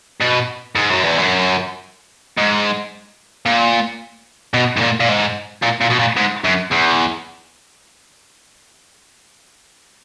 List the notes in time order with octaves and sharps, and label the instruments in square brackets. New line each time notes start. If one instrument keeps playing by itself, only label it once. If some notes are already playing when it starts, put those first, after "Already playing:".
[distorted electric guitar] B2
G#2
F#2
E2
F#2
G#2
A#2
B2
G#2
A#2
A#2
G#2
A#2
A#2
B2
A#2
G#2
F#2
E2